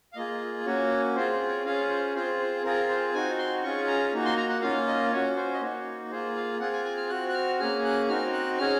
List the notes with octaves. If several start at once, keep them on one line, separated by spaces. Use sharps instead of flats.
F5
A#3 F4 G#4 D#5
A#3 C#4 F#4 C#5
C4 F4 G#4 C5
C5
C#5
C#4 F4 G#4 F5
C5
C4 F4 G#4 C5
C5
C4 F4 G#4 A#4
C5
C4 D#4 F#4 G#5
C6
C#4 F4 G#4 C#6
A#5
A#3 D#4 F#4
C6
A#5
F#5
A#3 C#4 F4 F5
D#5
C#4 F#4 C#5
C5
D#5
A#3 D#4 F#4 C#5
A#3 F4 G#4 C5
F5
C4 F4 G#4 F#5
G#5
G#5
F6
C4 F#4 F#6
F#6
F6
A#3 C#4 G#4 F6
F#6
C4 D#4 F#4 F6
F#6
C#4 G#4 F6